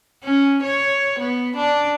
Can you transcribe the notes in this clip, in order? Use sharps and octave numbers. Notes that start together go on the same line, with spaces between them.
C#4
C#5
B3
D4